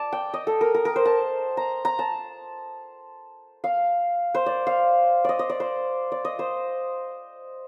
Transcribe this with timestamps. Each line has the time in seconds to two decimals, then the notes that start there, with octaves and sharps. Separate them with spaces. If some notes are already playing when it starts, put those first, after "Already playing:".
Already playing: D5 A5
0.13 G5
0.34 D#5
0.47 A4
0.61 A#4
0.74 A#4
0.85 A#4
0.96 C5
1.05 A5
1.57 A#5
1.85 A#5
1.99 A5
3.64 F5
4.35 C5
4.46 D5
4.67 F5
5.25 D5 D#5
5.39 D#5
5.50 D5
5.60 C5
6.12 D5
6.25 D#5
6.39 C5